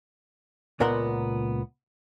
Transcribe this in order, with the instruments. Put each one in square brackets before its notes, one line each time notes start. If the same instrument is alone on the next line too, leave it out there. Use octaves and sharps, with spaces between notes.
[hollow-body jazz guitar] C#2 A#2 B3 A#4 F#5 C6